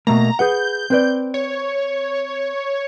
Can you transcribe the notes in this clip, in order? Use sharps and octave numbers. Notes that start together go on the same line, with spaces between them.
B2 A3 A#3 A#5
G#4 B4 F#5 G6
C4 B4 D5
C#5